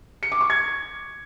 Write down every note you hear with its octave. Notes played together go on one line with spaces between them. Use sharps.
C#7
D6
C#6
G#6